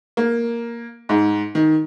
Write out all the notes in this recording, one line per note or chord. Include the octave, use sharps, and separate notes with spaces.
A#3
G#2
D#3